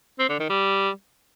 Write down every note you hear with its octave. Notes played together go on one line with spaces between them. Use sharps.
C4
D3
D#3
G3